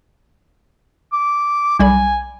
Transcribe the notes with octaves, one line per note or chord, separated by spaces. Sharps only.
D6
B1 G3 G#5 B5